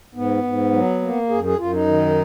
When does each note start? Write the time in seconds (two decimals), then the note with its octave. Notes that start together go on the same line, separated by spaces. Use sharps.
0.15 G#2 B3
0.44 G#2
0.73 F#3
1.02 A#3
1.30 F#2 G#4
1.44 G#4
1.59 F#2 F4
1.73 D#4
1.87 D#3